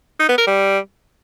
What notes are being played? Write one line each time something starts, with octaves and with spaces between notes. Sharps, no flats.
D#4
B3
A#4
G3